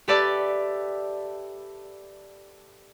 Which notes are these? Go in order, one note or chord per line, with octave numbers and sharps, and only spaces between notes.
G4 A4 B4 D5 E5 A5